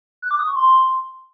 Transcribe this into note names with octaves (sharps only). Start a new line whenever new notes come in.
F#6
D6
D#6
C#6
C6